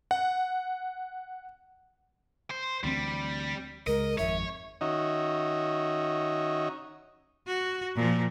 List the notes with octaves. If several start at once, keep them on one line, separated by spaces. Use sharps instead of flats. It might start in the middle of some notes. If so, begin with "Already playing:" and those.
F#5
C5
D2 E3 G3 C4
C#2 G#3 A#4 D#5
G#1 F2 G#2 C#5 E5
D#3 C#4 D#4 F#4 D#5 E5
F#4
A#2 F3